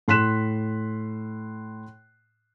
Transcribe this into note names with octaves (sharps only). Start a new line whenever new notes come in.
A2 C6 F#6 B6 E7